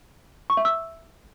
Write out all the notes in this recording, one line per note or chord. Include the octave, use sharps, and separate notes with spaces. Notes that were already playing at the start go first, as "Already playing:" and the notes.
C#6
E5
E6